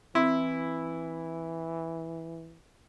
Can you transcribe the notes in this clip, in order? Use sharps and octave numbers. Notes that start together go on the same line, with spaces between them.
E3 C4 E4